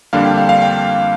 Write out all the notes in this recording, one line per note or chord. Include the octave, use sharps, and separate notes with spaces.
F2 D3 G3 A#3 D4 F5
G5
F5
F5
G5